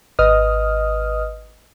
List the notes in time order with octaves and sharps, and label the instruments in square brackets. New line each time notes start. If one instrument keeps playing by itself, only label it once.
[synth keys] G#1 B4 D#5 D#6 F6